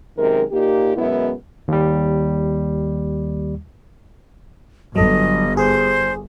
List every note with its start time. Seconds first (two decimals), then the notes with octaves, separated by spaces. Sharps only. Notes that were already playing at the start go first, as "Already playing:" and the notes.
0.17 F#2 C3 D#3 G#3 A#4
0.52 A#2 A#3 D#4 G4
0.96 F#2 B2 G#3 B3 E4
1.68 D#2 G3
4.96 G1 F#3 A4 D#5
5.57 G#4 C5